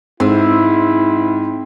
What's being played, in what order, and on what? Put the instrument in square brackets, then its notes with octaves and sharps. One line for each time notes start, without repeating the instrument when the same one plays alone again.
[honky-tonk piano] G#2 [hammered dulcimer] C4 [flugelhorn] E4